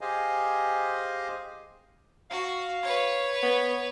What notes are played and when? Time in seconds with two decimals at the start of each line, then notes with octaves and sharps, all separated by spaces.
0.01 G4 G#4 C5 D#5 F5 G#5
2.30 F#4 F5
2.83 B4 C#5
3.43 B3